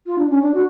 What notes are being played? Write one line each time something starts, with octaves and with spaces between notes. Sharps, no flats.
F4
D4
C#4
D4
F#4